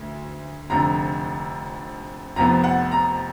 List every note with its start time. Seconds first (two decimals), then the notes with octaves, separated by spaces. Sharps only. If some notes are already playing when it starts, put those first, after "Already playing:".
Already playing: D2
0.70 F1 F2 D3 A#5
2.36 F1 F2 F3 B3 A#5
2.64 F#5
2.91 A#5